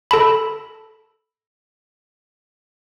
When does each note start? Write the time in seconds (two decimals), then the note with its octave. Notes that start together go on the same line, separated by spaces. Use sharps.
0.11 A4 A5 B5